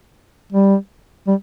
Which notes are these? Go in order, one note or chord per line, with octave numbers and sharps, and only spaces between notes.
G3
G3